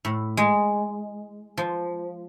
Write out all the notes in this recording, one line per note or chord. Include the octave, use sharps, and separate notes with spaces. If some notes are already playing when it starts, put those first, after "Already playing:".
A2
G#3
F3